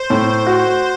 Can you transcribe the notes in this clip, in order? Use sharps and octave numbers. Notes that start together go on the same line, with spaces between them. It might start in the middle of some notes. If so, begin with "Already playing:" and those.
Already playing: C5
A2
F#4